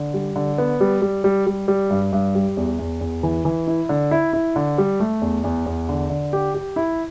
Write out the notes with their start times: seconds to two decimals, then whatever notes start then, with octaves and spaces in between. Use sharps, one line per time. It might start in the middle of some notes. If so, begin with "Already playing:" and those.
Already playing: D3
0.14 G3
0.36 D3
0.58 B3
0.81 G3
1.02 G3
1.24 G3
1.47 G3
1.68 G3
1.91 G2
2.13 G2
2.35 G3
2.57 E2
2.79 E2
3.01 E2
3.23 E3
3.45 E3
3.67 E4
3.89 D3
4.11 E4
4.33 E4
4.56 D3
4.78 G3
5.00 A3
5.22 E2
5.44 E2
5.66 E2
5.89 D3
6.10 D3
6.33 G4
6.55 G4
6.76 E4